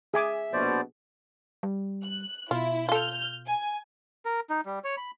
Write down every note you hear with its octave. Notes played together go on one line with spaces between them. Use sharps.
G#4 E5 G#5 D6
A#1 B2 C5 D5
G3
F#6
B2 E4 F4
F4 A4 F6 G6
G#5
A#4
D#4
G3
C#5
B5